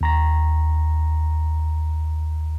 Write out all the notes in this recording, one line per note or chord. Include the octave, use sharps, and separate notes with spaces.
D#2 A#5 A#6